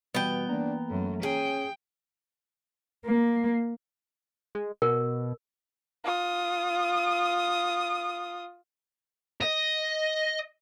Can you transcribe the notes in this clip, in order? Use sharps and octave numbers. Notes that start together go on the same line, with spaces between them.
B2 E3 G3 B3 G5
E3 A#3 D4 A#5
F#2 A3
C#4 G#4 G5
A#3
G#3
B2 A#4
F4 D#6
D#5